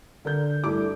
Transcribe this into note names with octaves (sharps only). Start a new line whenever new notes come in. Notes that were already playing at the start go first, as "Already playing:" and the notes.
D3 A#4 G6
G2 A3 E4 D6